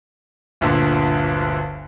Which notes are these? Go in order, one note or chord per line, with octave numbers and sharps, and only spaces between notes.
G1 D2 A#2 D3